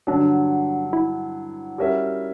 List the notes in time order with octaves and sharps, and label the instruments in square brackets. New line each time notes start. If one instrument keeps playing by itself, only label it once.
[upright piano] G2 D3 F#3 [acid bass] D4
[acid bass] E4
[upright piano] G3 C#4 F#4 A#4 E5